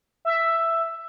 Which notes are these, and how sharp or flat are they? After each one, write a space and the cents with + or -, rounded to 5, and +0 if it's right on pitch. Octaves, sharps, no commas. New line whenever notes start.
E5 +5